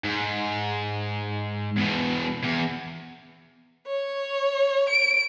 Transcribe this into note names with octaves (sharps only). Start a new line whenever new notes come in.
G#2
E2 B2
E2
C#5
D7